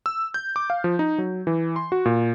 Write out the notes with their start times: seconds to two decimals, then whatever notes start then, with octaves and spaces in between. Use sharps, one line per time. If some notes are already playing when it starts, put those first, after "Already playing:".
0.06 E6
0.34 G6
0.56 D6
0.70 F5
0.84 F3
0.99 D#4
1.18 F#3
1.47 E3
1.76 C6
1.92 F#4
2.05 A#2